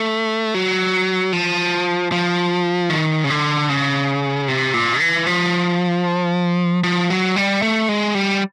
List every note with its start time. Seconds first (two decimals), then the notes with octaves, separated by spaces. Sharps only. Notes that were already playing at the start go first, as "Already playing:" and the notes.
Already playing: A3
0.54 F#3
1.33 F3
2.12 F3
2.90 D#3
3.24 C#3
3.30 D3
3.69 C#3
4.48 C3
4.74 A#2
5.00 E3
5.27 F3
6.84 F3
7.10 F#3
7.36 G3
7.62 A3
7.89 G#3
8.15 G3